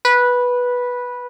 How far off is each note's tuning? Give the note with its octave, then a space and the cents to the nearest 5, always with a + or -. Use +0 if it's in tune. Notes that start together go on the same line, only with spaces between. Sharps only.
B4 -10